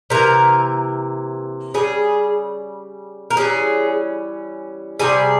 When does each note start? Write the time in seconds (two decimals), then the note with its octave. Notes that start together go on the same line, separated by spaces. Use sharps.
0.10 C3 E3 A#3 A#4
1.74 C#3 E3 G3 G#4
3.30 A#4
3.37 E3 G3 C#4 G#4
4.99 C3 E3 G3 G#4